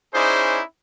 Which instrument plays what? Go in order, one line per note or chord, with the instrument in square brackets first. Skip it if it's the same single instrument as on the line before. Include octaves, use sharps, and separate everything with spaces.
[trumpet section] C#4 D#4 E4 G#4 C5 D5